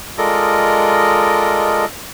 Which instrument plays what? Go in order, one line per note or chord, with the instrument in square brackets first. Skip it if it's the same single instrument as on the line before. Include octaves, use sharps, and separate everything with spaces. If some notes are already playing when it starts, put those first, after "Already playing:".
[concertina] G#3 F4 A4 A#4 D5 D#5